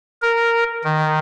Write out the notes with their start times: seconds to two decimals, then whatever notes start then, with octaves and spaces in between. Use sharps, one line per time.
0.22 A#4
0.84 D#3